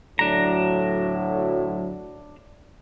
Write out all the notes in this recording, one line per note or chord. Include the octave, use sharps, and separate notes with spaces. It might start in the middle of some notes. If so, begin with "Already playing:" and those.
D2 A2 F#3 D4 A#5